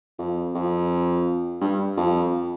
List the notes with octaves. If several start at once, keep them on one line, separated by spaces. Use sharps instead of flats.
F2
F2
G2
F2